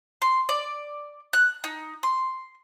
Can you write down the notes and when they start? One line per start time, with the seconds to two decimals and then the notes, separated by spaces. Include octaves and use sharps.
0.22 C6
0.49 D5
1.33 F#6
1.64 D#4
2.03 C6